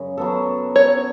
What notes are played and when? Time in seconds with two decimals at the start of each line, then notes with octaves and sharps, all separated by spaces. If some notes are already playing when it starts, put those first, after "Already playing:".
Already playing: F#2 C#3
0.17 F#3 B3 A4
0.76 C#5